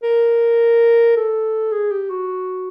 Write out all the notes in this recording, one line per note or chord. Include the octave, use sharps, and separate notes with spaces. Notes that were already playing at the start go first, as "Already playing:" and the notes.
A#4
A4
G#4
G4
F#4